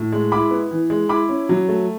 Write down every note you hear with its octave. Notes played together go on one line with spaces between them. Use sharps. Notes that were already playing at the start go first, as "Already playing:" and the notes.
Already playing: A2
G#3
E4 B5 D6
B3
E3
G#3
E4 B5 D6
C#4
F#3
A3